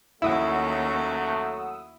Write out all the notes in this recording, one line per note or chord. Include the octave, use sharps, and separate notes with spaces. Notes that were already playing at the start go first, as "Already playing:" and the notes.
D#2 F#3 A3 C#4 E4 F#5 D#6 E6